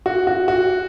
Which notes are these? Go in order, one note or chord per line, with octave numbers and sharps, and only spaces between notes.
F#4
F#4
F#4